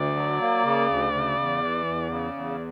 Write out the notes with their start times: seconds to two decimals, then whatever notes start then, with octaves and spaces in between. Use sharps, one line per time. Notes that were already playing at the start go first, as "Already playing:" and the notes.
Already playing: D2 D5
0.16 F#3
0.40 A#3
0.64 C#3
0.89 D2
1.13 C#3
1.37 E2
1.61 E3
1.86 E2
2.09 C#3
2.33 E2